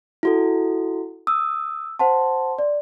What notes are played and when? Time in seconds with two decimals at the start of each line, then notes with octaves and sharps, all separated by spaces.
0.23 E4 F#4 A4
1.27 D#6 E6
1.99 C5 F#5 A5 C6
2.58 D5